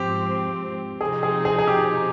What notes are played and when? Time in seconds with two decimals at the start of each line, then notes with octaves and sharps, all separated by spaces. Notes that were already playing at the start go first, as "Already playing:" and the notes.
Already playing: G#2 F3 C4 G4
1.01 C3 F3 C4 D#4 G#4
1.23 G#4
1.45 G#4
1.59 G#4
1.67 G4